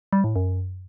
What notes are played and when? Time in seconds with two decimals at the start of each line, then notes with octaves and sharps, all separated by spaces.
0.13 G3
0.24 A2
0.36 F#2